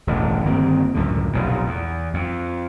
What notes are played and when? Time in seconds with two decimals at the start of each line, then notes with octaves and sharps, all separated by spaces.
0.07 E1 A1 G2
0.46 G1 D#3 A#3 C4
0.94 C#2 F#2 A2 D3
1.33 F1 B1 A#2
1.67 E2
2.14 F2